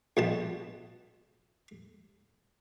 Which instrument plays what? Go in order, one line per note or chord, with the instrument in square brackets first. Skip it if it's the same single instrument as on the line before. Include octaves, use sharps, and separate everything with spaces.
[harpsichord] A#1 B2 A5